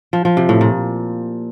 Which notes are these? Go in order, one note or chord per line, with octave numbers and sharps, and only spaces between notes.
F3
F3
C3
A2
A#2